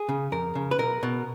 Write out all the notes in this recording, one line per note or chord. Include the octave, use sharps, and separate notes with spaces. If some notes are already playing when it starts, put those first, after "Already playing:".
Already playing: G#4
C#3
F2 A#4
C#3
B4
B1 A#4
B2